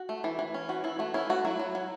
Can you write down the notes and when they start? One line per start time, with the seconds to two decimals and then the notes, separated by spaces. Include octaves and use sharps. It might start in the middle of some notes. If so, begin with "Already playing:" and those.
Already playing: F#4
0.09 A3
0.24 E3
0.39 E3
0.54 C#4
0.69 E3 F#4
0.84 E3 E4
0.99 A3 F#4
1.14 C#4 E4
1.29 A3 F#4
1.45 F#3 E4
1.59 F#3
1.75 F#3